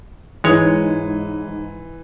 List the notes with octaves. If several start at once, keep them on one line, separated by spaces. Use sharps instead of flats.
G#2 E3 G#3 C#5